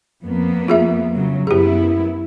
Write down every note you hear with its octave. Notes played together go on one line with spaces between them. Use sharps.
F2 A#3 B3
F4 G#4 E5
C#3 F#3
F#2 B3 E4 G4 G#4